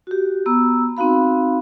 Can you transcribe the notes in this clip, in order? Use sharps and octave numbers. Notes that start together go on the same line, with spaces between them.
F#4 G4
B3 A#5 E6
C4 D#4 F#4 F5 B5